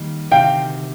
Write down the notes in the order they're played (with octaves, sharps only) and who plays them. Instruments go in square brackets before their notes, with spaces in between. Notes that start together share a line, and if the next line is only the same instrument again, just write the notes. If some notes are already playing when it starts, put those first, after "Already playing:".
Already playing: [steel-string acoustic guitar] D#3 G3 A#3
[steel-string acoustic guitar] D2 C3 D#3 [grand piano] F5 G5